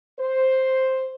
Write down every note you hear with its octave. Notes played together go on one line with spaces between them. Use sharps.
C5